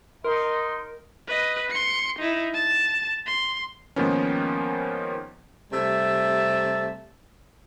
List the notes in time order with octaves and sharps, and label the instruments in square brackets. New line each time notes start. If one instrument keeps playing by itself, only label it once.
[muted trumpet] D#4 [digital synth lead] A#4 [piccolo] C6
[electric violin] B4 D#5
C6 C#7
D#4 E4
A5
C6
[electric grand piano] G#2 D#3 F3 A#3 B3 C#4
[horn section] C3 G3 A3 E5 A5